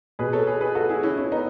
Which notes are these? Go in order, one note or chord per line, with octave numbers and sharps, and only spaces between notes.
B2 G#4 B4
A4 C#5
G#4 B4
G#4 B4
F#4 A4
E4 G#4
C#4 E4
C#4 E4
B3 D#4